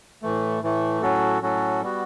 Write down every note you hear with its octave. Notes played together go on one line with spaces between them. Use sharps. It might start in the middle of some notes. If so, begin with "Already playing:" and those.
A2 E3 A3
A2 E3 A3
A2 F#3 C#4 F#4 A4
A2 F#3 C#4 F#4 A4
G3 B3 F#4